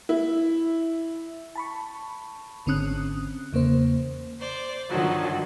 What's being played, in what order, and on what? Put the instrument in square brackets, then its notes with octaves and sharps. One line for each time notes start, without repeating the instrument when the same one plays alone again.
[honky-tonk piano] E4
[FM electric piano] A5 B5 C#6
G#1 D3 C4 C#4 D#6 F#6
E2 C#3 A#3 C5
[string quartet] C5 D5
G2 D3 D#3 F3 F#3 F#4